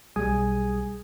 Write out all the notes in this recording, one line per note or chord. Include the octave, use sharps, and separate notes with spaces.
B1 G3 G#4 G#5 D#6